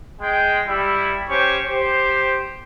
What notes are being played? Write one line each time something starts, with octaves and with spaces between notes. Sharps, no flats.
G#3 G5
G3 E4
C#4 G4 C5 C#6
G4 C5